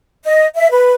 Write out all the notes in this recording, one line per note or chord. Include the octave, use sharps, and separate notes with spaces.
D#5
E5
B4